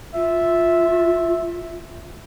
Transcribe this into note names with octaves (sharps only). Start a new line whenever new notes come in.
F4 E5